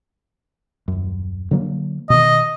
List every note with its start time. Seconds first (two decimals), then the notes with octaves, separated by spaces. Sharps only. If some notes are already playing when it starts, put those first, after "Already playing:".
0.88 D#1 F#2
1.51 D3 F#3 A#3
2.10 B2 D#3 D#5